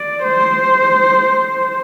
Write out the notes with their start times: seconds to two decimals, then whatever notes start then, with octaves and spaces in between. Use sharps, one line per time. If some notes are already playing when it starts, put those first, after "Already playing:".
Already playing: D5
0.23 C5